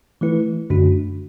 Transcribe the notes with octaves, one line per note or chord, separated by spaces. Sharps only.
E3 A3 E4 B4
F#2 D3 A3 D4 F#4